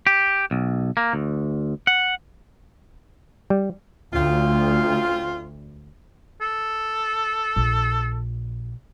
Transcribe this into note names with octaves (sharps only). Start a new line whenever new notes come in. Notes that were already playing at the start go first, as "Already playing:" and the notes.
G4
B1
A#3
D2
F#5
G3
D2 C4 C#4 F4
A4
A#1